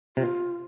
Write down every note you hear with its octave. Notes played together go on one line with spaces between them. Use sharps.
C3 F4